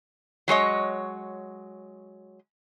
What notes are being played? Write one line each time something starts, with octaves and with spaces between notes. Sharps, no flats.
F#3 G#3 C#5 D#5